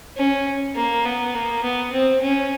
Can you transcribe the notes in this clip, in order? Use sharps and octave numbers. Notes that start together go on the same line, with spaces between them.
C#4
A#3
B3
A#3
B3
C4
C#4